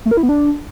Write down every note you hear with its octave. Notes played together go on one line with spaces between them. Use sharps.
A3
A#4
E4
B3
D4